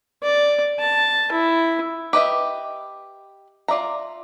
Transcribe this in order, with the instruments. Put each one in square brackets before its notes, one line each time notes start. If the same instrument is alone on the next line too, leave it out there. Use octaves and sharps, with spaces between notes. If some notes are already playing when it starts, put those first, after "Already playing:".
[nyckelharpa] D5
A5
E4
[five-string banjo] G4 B4 D#5 E5
F4 D5 E5 A#5